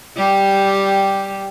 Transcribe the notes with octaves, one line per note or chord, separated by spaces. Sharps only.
G3 G4